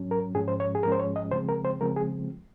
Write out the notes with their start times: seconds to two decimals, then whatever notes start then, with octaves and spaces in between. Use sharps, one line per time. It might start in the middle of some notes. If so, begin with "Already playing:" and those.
Already playing: G#2 F#3 C#4
0.11 A#4
0.35 G#2 F3 G#3 C#4 G#4
0.48 C5
0.60 C#5
0.75 G#4
0.83 G#2 F3 G#3 C#4 A#4
0.92 C5
1.00 C#5
1.16 D#5
1.31 C#3 F3 G#3 C4 C5
1.49 A#4
1.65 C5
1.81 C#3 F3 G#3 C4 A#4
1.96 G#4